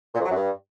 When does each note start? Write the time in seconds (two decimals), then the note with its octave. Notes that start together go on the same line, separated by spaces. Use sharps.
0.15 A#2
0.20 F2
0.25 F#3
0.31 F#2
0.36 G2